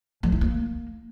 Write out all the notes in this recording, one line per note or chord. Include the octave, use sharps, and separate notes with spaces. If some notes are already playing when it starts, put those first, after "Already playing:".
F3
E4
A#3